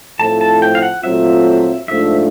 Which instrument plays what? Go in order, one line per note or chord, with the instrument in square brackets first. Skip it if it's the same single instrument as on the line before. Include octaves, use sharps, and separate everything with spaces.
[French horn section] A2 F3 A3 C4 E4 [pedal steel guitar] A5
[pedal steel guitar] A5
G5
F5
F#5
[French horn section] A#2 F#3 A3 C4 F4 [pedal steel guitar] E5
[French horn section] G#2 F3 A3 D4 F4 [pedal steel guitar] E5